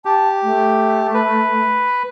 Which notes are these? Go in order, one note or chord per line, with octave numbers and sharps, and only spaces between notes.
G4 A5
A3
B4